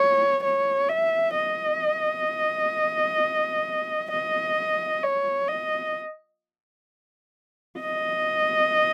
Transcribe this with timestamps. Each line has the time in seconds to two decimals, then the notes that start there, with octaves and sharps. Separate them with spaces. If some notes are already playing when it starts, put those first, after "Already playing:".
Already playing: C#5
0.44 C#5
0.89 E5
1.35 D#5
4.11 D#5
5.03 C#5
5.48 D#5
7.79 D#5